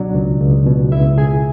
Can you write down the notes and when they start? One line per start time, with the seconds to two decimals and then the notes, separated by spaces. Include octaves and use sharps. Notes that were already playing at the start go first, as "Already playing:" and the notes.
Already playing: C#2 B2 F#3 D4 D5
0.15 C#2
0.41 C#2
0.66 B2
0.92 C#2 E4 E5
1.18 B2 G#4 G#5